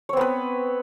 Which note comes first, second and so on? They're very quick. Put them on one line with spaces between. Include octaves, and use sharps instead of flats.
C#5 C4 B3 B4